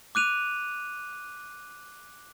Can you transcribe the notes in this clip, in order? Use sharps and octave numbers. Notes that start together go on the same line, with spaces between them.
D6 F#6 D#7 F7